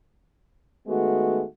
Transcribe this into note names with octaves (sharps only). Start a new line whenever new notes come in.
D#3 G#3 A3 B3 F#4